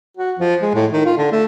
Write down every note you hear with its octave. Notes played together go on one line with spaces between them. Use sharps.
F#4
F3
G#3
A2
D#3
F4
D3
A3